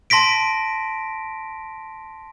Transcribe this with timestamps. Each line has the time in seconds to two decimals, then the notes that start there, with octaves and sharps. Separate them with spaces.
0.10 A5 C6 A#6 B6 D7